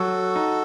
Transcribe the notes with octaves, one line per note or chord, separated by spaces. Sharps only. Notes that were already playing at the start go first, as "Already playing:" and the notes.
Already playing: F#3 F#4 A4
D#4